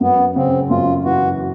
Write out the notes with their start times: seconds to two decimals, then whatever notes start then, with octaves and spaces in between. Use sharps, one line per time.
0.01 F#2 B3
0.36 C#3 C4
0.70 F#2 F4
1.05 E3 F#4